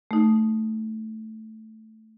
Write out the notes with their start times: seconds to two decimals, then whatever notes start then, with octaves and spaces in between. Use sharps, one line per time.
0.11 A3 D#4